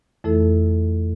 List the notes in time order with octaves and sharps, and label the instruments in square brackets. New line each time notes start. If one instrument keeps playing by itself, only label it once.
[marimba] F2 E3 A3 E4 A4